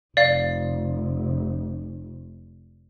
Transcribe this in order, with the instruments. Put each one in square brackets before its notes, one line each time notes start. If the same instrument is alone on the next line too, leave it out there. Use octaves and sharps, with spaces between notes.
[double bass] F1 [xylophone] D5 F5